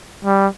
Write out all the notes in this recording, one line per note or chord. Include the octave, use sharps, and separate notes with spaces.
G3